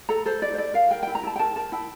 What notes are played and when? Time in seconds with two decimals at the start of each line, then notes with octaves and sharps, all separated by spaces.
0.09 A4 A#5
0.26 A4 C5
0.42 E4 D5
0.54 C5
0.58 E4 D5
0.74 A#4 F5
0.91 A#4 G5
1.03 E4 G5
1.15 A#5
1.23 E4 A5
1.36 G5
1.39 A#4 A5
1.56 A#4 A5
1.72 E4 G5